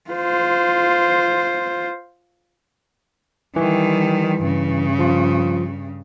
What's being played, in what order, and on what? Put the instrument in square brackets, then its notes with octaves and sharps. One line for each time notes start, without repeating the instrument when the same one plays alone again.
[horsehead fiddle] F4 C5
[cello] D#3 G3 [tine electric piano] E3
[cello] G2 C#3
[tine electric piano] F3 F4